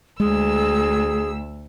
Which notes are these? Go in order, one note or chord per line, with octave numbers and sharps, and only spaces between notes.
D2 G#3 G#4 E6